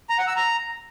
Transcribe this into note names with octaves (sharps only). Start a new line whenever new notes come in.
A#5
F#5
E6
A#5